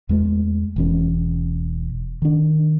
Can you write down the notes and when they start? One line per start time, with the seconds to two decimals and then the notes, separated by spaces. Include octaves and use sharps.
0.09 E2 G#3 A3
0.76 E1 E3 C#4
2.22 D#3 D4